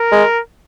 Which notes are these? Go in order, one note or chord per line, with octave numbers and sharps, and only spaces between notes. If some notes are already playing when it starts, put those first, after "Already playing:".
Already playing: A#4
G#3